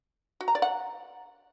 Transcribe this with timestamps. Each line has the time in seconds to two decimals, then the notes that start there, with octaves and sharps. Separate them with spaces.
0.41 F#4
0.48 A#5
0.55 D5
0.62 F#5